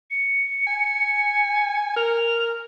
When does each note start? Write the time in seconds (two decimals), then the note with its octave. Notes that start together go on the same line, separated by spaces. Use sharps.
0.11 C#7
0.67 G#5
1.96 A#4 F7